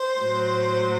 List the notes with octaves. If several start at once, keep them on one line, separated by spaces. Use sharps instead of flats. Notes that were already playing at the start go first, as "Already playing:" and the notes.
Already playing: C5
A2 F#3